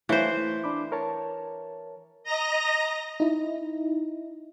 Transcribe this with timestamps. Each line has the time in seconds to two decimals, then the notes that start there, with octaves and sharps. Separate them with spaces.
0.09 E3 A3 C5 C#5 F5
0.37 A3
0.64 D4 B5 D6
0.92 A#4 C#5 A5
2.24 D#5 A#5 A#6
3.20 D#4 E4